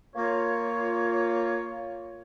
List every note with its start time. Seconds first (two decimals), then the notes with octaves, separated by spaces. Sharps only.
0.15 A#3 F4 C#5